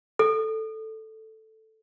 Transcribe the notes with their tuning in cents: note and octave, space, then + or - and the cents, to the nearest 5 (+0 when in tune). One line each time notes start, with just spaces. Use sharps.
A4 +0